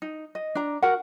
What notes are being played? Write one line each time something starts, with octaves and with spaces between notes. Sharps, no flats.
D#4
D#5
D4 A#5
F#4 A#4 F#5